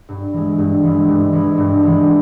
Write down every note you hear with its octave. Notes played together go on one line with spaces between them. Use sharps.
G2
E3 G#3
G2
E3 G#3
G2
E3 G#3
G2
E3 G#3